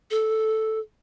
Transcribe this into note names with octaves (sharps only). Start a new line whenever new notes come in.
A4